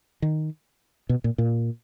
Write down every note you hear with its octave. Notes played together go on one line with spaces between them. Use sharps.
D#3
B2
A#2
A#2